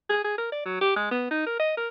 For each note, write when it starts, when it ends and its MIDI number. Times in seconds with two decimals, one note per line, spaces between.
0.09 0.24 68
0.24 0.37 68
0.38 0.48 70
0.52 0.61 74
0.65 0.81 54
0.81 0.92 67
0.96 1.06 56
1.11 1.27 59
1.31 1.46 63
1.46 1.59 70
1.59 1.72 75
1.77 1.88 70